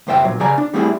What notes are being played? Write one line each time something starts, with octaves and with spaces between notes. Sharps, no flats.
C#2 F#2 C5 E5 G5
A#2 F#3
C#3 G#4 D5 G#5 A#5
D4
G3 A3 C4 E4 G#4